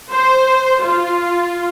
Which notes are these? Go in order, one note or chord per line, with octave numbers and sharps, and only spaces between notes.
C5
F4